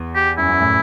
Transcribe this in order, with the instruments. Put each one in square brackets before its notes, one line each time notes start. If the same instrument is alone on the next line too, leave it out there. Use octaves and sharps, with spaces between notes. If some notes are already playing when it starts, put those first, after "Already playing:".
Already playing: [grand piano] E2
[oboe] G4
[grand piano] F#2 [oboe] E4
[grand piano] F#2
A2